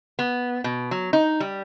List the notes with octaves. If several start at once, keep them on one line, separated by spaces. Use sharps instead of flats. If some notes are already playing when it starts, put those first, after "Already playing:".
B3
B2
F#3
D#4
G3